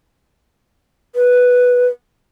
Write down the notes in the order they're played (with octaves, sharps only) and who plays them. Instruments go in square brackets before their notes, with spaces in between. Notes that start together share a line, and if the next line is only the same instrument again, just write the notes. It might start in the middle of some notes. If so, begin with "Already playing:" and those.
[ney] B4